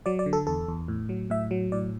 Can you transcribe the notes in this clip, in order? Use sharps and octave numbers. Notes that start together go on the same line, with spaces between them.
F#3 D5
D5
D3
A4
E2 A4
E2
A2
F#3
A2 E5
F#3
A2 D5